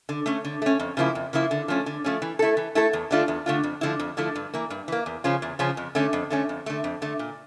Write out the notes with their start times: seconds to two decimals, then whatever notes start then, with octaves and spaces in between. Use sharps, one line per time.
0.09 D3
0.26 A3 C#4
0.45 D3
0.62 A3 C#4
0.80 F2
0.97 C#3 F3 A#3 E4
1.15 F2
1.33 C#3 F3 A#3 E4
1.51 D3
1.68 F3 A3 C#4
1.86 D3
2.04 F3 A3 C#4
2.22 E3
2.39 A3 E4 A4
2.57 E3
2.75 A3 E4 A4
2.93 E2
3.11 D3 A3 D4 F4
3.28 E2
3.46 D3 A3 D4 F4
3.63 F2
3.81 D3 F3 A3 E4
4.00 F2
4.17 D3 F3 A3 E4
4.36 G2
4.54 E3 A#3
4.70 G2
4.88 E3 A#3
5.06 E2
5.24 C#3 F3 C#4 F4
5.42 E2
5.59 C#3 F3 C#4 F4
5.77 F2
5.95 D3 A3 C#4
6.13 F2
6.30 D3 A3 C#4
6.49 F2
6.66 D3 A3
6.84 F2
7.02 D3 A3
7.19 A#2